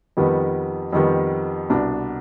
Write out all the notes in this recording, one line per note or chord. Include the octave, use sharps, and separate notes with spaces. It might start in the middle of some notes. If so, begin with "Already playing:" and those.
F2 D#3 G3 B3
F2 D#3 G3 B3
C2 B2 B3 D4